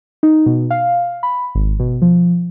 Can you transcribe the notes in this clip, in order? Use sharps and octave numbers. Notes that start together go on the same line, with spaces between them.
D#4
B2
F5
B5
G#1
B2
F3